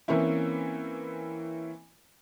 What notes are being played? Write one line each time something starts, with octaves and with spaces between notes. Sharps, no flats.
E3 A#3 C4 C#4 E4